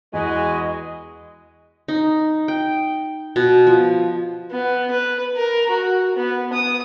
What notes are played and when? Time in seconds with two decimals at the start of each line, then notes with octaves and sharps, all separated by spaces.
0.13 E2 G#3 F#4 B4 D#5 G#5
1.88 D#4
2.48 G5
3.36 B2
3.67 F3
4.51 B3
4.91 B4
5.36 A#4
5.70 F#4
6.16 B3
6.53 D#6